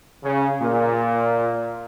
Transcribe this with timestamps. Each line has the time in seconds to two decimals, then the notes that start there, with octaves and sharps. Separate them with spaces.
0.23 C#3
0.61 A#2